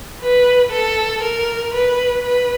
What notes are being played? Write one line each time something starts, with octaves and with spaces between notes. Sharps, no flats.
B4
A4
A#4
B4
B4